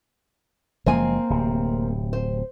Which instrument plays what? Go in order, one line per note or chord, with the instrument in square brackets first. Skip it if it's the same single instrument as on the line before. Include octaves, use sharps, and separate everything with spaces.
[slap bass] F#1 F3 G#3 [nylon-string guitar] A#3 C4 G#5
[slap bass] D1 C3
[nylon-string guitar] C5